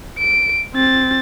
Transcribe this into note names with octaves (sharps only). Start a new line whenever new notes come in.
D7
C4 A6